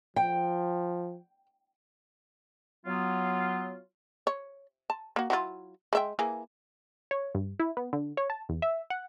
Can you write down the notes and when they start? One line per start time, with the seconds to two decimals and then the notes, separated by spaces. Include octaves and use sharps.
0.16 F3 G5
2.86 F#3 B3 F4
4.27 C#5
4.90 A5
5.16 A#3 F#4
5.30 F#3 E4 F4
5.93 G#3 E5 G5
6.19 E3 A#3 G#4
7.11 C#5
7.35 G2
7.59 E4
7.77 B3
7.93 D3
8.17 C#5
8.30 A5
8.49 E2
8.62 E5
8.90 F#5